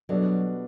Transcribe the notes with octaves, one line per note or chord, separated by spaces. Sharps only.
B2 F#3 G3 B3 D4 A4